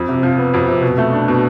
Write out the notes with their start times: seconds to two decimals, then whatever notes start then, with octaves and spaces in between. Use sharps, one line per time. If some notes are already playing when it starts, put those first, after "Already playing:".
Already playing: F2
0.08 C3
0.23 F3
0.38 B3
0.54 F2
0.68 C3
0.82 B2
0.98 A3
1.13 D4
1.28 B2